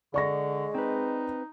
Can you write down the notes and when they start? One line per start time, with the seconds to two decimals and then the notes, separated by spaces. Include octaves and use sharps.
0.14 D3 G#3 D5 C#6 A#6
0.75 C4 D#4 B4